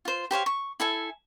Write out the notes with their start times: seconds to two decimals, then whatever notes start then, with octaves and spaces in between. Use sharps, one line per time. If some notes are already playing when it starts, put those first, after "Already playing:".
0.05 F4 C5
0.31 G4 C5 C#5 F5
0.46 C#6
0.80 E4 A4 G#5